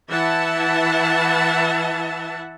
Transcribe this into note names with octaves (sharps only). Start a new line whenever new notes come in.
E3 E4 E5 F#5 A5